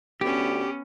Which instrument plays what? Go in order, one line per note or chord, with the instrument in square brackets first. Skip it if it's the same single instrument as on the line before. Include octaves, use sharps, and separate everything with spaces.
[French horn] D2 [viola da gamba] B3 C#4 [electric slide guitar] G4